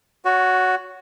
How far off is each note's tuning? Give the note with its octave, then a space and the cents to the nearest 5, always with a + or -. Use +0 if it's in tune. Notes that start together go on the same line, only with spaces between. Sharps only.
F#4 +0 C#5 +20